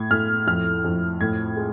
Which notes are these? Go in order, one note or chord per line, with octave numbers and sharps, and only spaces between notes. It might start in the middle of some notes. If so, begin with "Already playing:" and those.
Already playing: A2 G#6
A2 F6
F2 F6
F2
A2 G#6
G#3